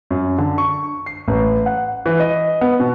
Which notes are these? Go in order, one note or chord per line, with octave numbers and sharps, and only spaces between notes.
F#2
D3
C#6
C7
A1
F#5
E3
D#5
B3
B2